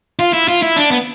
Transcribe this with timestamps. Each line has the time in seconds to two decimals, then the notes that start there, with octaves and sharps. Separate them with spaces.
0.19 F4
0.33 E4
0.48 F4
0.62 E4
0.76 D4
0.91 B3